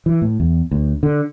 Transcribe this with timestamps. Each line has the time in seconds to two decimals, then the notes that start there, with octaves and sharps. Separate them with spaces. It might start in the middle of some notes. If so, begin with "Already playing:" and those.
0.06 E3
0.22 A2
0.40 E2
0.71 D2
1.03 D3